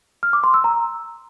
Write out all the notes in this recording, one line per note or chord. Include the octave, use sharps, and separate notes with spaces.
F6
D6
C6
E6
A#5